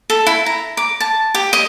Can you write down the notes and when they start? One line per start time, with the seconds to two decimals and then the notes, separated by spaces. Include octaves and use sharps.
0.10 A4
0.26 E4
0.46 A#5
0.77 D6
1.00 A5
1.34 G4
1.53 D#5